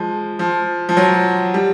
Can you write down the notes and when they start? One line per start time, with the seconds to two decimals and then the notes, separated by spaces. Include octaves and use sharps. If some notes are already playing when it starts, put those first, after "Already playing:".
Already playing: F3 G#3
0.39 F3
0.89 F3
0.97 F#3
1.54 G3